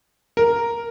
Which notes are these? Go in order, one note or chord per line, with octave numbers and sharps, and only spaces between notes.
A#4